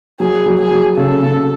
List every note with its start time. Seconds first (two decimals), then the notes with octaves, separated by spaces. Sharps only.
0.20 F#3 G#4
0.46 F#3
0.58 G#4
0.71 F#3
0.97 C#3 A4
1.23 C#3